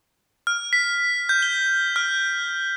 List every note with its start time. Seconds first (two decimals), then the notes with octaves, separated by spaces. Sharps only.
0.47 F6
0.73 B6
1.29 G6
1.42 G7
1.96 F6